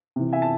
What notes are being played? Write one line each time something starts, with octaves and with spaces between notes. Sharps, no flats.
C3 E3
E5 G#5
A5